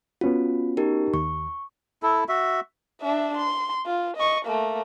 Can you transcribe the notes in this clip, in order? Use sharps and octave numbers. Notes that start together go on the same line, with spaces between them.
B3 C#4 F4 F#4
D#4 G4 A#4
D#2 C#6
E4 A4
F#4 E5
D4 E5
C6
F4
D#5 C#6
A3 A#3